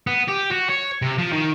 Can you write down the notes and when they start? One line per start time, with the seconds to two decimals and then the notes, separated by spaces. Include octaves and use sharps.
0.07 B3
0.28 G4
0.52 F#4
0.70 C#5
1.02 C3
1.18 F3
1.32 D#3